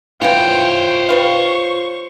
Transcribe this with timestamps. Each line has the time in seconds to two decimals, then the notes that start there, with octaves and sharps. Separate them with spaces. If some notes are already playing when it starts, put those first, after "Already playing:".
0.22 E3 F#3 B3 F4 C5 C#5 G5
1.09 G3 B4 F5 C#6